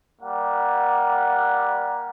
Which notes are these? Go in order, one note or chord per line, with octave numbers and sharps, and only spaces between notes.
G3 A#3 F#5